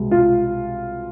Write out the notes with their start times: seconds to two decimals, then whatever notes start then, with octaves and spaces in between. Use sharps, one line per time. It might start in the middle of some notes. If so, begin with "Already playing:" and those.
Already playing: C2 B2 G#3
0.11 F4